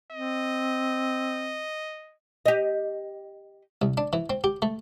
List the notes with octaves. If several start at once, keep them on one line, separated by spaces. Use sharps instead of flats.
C4 D#5
G4 D#5
C2
D4
E3
C4
G4
A3